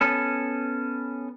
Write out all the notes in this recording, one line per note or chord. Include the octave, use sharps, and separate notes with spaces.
B3 C#4 A4